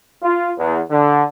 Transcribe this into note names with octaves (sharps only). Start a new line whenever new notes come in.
F4
E2
D3